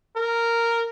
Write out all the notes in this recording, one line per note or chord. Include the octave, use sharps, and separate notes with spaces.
A#4